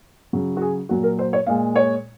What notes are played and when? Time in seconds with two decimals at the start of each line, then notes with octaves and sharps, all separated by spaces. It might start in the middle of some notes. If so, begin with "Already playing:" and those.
0.33 C#3 F#3
0.57 F#4
0.62 G#4
0.89 A#2 F#3 F#4
1.03 A#4
1.19 C5
1.33 C#5
1.46 A#2 G#3 F5
1.76 C#5